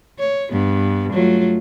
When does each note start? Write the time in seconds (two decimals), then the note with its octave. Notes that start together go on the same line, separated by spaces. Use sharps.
0.19 C#5
0.52 G2 B3
1.13 F#3 A3 F4